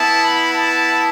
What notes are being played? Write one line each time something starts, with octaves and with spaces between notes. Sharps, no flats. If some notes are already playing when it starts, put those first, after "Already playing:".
Already playing: B3 E4 A5
B5
A5